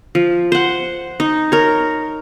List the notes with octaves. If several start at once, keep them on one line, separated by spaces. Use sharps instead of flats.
F3
C5 F#5
D#4
A#4 C#5